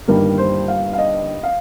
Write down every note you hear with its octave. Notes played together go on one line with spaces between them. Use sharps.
G1 G2 D#3 G3 A#3 A#4
C5
F5
F5
D#5
F5